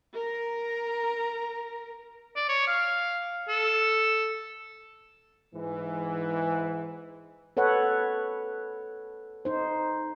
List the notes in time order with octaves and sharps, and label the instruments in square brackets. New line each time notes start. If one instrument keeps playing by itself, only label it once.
[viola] A#4 A#5
[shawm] D5
C#5
F5
A4
[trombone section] G#2 E3
[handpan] A4 B4 C#5 F#5
D#4 C5